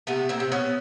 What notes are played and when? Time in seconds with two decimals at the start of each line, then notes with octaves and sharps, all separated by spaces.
0.07 C3 A3 B3
0.29 A#3 C4
0.40 C3
0.52 B3 C#4